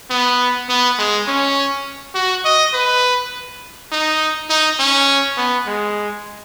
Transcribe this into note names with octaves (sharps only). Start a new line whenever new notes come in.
B3
B3
G#3
C#4
F#4
D#5
B4
D#4
D#4
C#4
B3
G#3